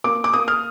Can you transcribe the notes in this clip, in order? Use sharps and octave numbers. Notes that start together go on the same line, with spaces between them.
A#3 D6
D6
A#3 D#6
F6